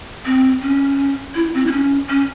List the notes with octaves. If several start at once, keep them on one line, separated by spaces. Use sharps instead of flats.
C4
C#4
E4
C4
E4
C#4
C#4